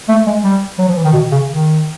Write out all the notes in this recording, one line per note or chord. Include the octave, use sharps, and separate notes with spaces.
A3
G#3
G3
F#3
F3
E3
D#3
B2
C#3
D#3